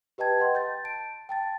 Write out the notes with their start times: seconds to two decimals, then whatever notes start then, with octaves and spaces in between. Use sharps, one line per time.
0.18 G4 B4 D#5 G5 A5 G#6
0.38 D#5 F#5 G5 C6
0.55 G6 A6
0.84 A5 D7
1.29 G5 A5 A6